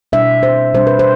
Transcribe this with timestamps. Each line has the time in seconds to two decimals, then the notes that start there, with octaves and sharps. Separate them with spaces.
0.12 B2 G3 D4 E5
0.43 C5
0.74 B2 G3 D4 C5
0.87 B4
0.99 C5